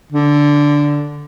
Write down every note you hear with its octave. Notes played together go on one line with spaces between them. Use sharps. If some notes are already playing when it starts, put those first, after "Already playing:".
D3